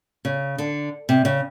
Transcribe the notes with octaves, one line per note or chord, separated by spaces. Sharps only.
C#3
D3
C3
C#3